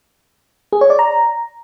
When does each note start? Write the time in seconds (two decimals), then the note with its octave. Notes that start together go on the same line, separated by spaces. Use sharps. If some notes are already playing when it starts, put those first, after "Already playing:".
0.73 G#4
0.81 C#5
0.90 D5
0.99 A#5